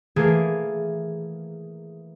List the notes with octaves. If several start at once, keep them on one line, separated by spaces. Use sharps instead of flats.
E3 A3 A#3 G#4 A#4